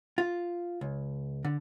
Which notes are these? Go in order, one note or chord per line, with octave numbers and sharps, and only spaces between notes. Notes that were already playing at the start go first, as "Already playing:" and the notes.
F4
C#2
D3